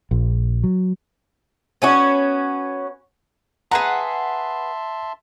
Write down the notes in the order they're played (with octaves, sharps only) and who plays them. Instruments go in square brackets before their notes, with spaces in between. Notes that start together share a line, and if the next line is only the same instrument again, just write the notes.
[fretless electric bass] A#1
F#3
[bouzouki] B3 C#4 F#4
[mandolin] G#4 B4 F#5 [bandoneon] E5 A5 C6 [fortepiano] A#5